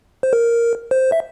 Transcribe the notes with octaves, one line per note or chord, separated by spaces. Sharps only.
C5
A#4
C5
E5